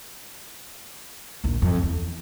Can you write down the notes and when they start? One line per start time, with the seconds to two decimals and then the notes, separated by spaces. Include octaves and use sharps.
1.44 A#1 D#2
1.62 F2
1.83 E2